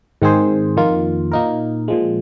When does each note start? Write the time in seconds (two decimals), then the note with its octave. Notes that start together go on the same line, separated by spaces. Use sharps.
0.22 G#2 D#3 C4 G#4 C5
0.77 F2 D#3 A#3 F4
1.32 A#2 A#3 D#4 A#4
1.88 A#2 F3 G#3